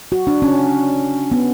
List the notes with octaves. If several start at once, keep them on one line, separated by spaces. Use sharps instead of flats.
F#4
D4
C#4
B3